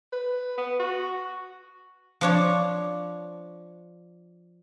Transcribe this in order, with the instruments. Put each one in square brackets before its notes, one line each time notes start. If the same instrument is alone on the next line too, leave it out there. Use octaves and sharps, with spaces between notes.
[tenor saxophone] B4
B3
F#4
[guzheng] F3 D4 C#5